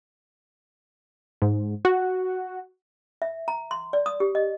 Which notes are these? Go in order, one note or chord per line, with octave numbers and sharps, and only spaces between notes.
G#2
F#4
E5
A#5
C6
D5
D#6
G4
D#5